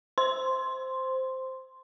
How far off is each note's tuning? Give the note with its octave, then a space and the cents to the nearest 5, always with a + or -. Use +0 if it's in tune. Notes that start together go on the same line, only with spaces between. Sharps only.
C5 -5 C6 +0